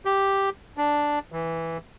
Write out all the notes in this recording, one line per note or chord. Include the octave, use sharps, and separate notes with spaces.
G4
D4
E3